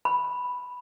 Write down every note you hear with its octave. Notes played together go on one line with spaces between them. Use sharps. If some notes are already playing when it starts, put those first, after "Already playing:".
B5